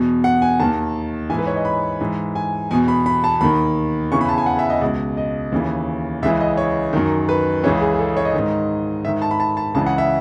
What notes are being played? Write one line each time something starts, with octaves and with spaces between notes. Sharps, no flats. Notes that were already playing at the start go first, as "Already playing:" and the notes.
Already playing: E2 B2
F#5
G#5
D#2 D#3 A5
G#2 E3 G#5
B4
C#5
D#5
B5
G#2 E3
G#5
E2 B2 G#5
B5
B5
A5
D#2 D#3 B5
E2 C#3 E3 C#6
B5
A5
G#5
F#5
E5
D#5
C#2 B2
D#5
D#2 C#3 E3
C#2 C#3 E3 E5
D#5
C#5
F#2 D#3
B4
C#2 C#3 E3 C#5
G#4
G#4
A4
C#5
D#5
G#2 D#3
G#2 D#3 E5
A5
B5
A5
A5
C#2 C#3 E3 A5
F#5
E5